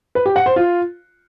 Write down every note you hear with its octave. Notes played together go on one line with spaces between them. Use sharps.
B4
G4
F#5
C5
F4